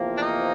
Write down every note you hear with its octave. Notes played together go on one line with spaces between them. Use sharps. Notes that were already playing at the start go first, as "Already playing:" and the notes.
Already playing: E2 C3 F3 A#3
D4
D#4